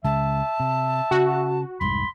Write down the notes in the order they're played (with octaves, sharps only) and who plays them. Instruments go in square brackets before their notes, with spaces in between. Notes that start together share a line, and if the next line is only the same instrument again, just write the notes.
[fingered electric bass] C#2 C#3 G#3 [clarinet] E5 [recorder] A5
[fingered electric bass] C3
[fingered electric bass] C#3 [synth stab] F#4
[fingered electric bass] F1 C2 G#2 [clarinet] B5 [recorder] C6